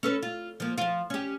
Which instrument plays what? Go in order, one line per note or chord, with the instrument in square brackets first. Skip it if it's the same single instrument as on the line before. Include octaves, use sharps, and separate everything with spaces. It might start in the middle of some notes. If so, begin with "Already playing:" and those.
[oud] C#4 A4 B4
F4
F3 A#3
F3 F4
C#4 G4